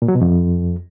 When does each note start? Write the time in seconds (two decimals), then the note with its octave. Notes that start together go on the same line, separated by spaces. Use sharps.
0.02 A#2
0.08 F#3
0.15 B2
0.21 F2